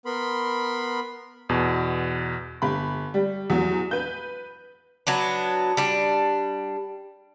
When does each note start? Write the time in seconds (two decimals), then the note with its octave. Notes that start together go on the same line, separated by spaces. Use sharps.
0.06 B3 A#4 B5 C6
1.49 E2 B2
2.62 G1 B5
3.14 G3
3.50 E2 F#3
3.91 B4 G6
5.07 F#3 B3 D4
5.77 G3 D4